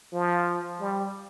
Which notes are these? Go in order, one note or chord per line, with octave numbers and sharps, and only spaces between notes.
F3
G3